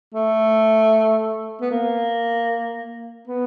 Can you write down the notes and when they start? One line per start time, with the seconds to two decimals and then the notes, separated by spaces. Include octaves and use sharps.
0.15 A3
1.61 B3
1.71 A#3
3.27 B3